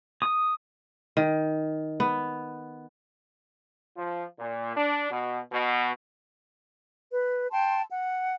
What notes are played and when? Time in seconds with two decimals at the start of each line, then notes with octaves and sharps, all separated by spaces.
0.22 D#6
1.17 D#3
2.00 B3
3.97 F3
4.39 A#2
4.76 D4
5.10 B2
5.52 B2
7.11 B4
7.51 G5 A5 C6
7.90 F#5